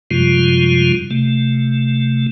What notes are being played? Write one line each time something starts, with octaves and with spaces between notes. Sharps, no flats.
F#2 C3 F3 G3 G#3 F4
C3 A3